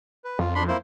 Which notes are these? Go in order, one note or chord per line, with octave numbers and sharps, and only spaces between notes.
B4
F2 F4
D4 B5 C6
A#3 E4 C5